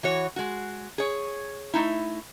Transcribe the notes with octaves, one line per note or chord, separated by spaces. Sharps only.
E3 F#4 C#5
G#3 F#4
G#4 C#5
A3 D#4 E4